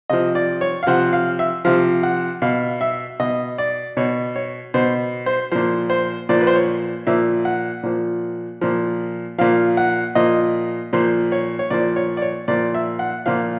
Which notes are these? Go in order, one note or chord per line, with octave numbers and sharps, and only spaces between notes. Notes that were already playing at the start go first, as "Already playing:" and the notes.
C3 F3 D#5
D5
C#5
F5
C3 F3 F#5
F5
E5
C3 F3 F5
F#5
B2 F5
E5
B2 D#5
D5
B2 C#5
C#5
B2 C5
C5
A#2 F3 C5
C5
A#2 F3 D5
B4
C5
C#5
A#2 F3 E5
F#5
A#2 F3
A#2 F3
A#2 F3 F5
F#5
A#2 F3 D#5
A#2 F3 C5
C#5
C#5
A#2 F3 D5
C#5
D5
C#5
A#2 F3 D5
E5
F#5
A#2 F3 F5